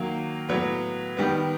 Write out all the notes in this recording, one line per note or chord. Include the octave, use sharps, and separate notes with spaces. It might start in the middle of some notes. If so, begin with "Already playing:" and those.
Already playing: D#3 F#3 A#3 F5
A2 F#3 B3
D#3 G3 B3